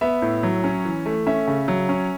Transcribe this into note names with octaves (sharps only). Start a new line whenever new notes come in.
B3 E5
A2
F#3
C#4
E3
A3
C#4 E5
C#3
F#3
C#4